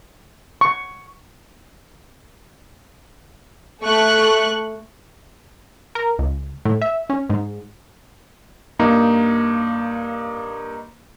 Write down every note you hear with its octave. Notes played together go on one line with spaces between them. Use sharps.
C#6
A3 C#6 F#6
A#4
C#2
A2
E5
C#4
G#2
G2 A#3 D#4